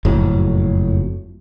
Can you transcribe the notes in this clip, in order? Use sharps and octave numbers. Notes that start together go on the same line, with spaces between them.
F#1 F2 A2 F#3